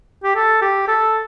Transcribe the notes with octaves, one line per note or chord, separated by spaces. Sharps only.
G4
A4
G4
A4